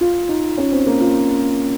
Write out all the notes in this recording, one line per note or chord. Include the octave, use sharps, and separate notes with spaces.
F4
D#4
C#4
C4
A#3
F4